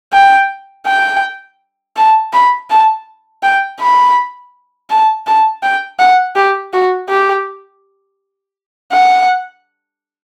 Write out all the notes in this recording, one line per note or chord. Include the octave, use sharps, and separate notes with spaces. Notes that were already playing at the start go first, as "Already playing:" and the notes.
G5
G5
A5
B5
A5
G5
B5
A5
A5
G5
F#5
G4
F#4
G4
F#5